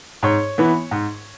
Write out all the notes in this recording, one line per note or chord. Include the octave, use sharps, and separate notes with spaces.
G#2 C#5
E3 B3 E4
G#2